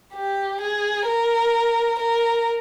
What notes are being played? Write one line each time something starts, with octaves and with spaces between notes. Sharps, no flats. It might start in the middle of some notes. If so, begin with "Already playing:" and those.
G4
G#4
A#4
A#4